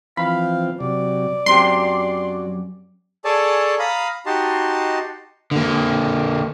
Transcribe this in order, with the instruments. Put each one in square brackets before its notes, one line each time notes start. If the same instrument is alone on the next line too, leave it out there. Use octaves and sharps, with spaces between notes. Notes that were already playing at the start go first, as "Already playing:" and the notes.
[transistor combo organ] E3 F3 C4 [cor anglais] F5 [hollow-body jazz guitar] B5
[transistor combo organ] C3 F#3 [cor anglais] D5
[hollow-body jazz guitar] F#2 C4 G4 [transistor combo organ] F#3 [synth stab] C6
[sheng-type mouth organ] G#4 A4 C#5 D5 G#5 A5
F5 A#5 B5 D#6
D#4 F#4 G4 D#5 A5 C6
[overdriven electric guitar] D3 A#3